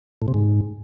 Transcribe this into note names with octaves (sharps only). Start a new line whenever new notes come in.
A2
C3
G#2